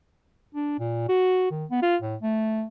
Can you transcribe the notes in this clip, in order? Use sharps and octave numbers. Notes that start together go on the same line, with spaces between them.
D4
A#2
F#4
D#3
B3
F4
A2
A3